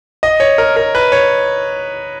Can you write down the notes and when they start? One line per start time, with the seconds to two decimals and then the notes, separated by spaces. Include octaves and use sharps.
0.23 D#5
0.40 C#5
0.58 A#4
0.76 A#4
0.95 B4
1.12 C#5